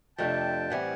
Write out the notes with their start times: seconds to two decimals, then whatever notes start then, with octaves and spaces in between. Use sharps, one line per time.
0.18 F2 C3 F3 A3 D4 G5 A5
0.70 A2 E3 G3 C4 F#5 G#5